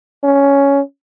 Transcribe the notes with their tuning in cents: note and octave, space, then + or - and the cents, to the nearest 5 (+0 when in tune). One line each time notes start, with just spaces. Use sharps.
C#4 +10